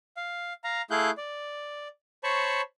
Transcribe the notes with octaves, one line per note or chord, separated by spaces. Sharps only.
F5
F5 A#5
A3 E4 G#4 F5 F#6 G6
D5
C5 C#5 A5 B5 C#6